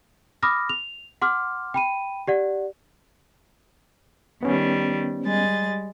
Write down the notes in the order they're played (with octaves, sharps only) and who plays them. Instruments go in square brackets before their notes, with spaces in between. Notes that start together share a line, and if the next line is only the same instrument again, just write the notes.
[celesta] B5 D6 D#6 F6 A#6
F7
F#5 C6 D6 F6
G5 B5 D#7
G4 D5 F#5
[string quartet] D#3 G3 [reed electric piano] B3 C#4
[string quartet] G3 G#3 A6